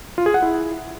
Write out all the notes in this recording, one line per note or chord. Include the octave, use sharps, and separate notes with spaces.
F4
G#4
F#5
E4